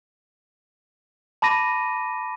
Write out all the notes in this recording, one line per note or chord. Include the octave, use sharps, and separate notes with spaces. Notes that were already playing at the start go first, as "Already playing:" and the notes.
A5 B5 D6 A#6 D#7